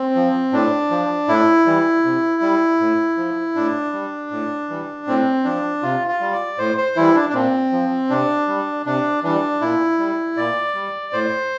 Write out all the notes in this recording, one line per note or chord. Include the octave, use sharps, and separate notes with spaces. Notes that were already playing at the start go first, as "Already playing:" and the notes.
Already playing: C4
F3
A2 D4
F3
A2 E4
E3 G3
C3
G3
A2
F3
A2 D4
G3
A2
E3 G3
A2 C4
F3 D4
C3 F4
F4
G3
D5
A2 C5
C5
E3 G3 E4
D4
D4
A#2 C4
F3
C3 D4
G3
C3 D4
E3 G3 D4
A#2 E4
G3
A#2 D5
G3
A2 C5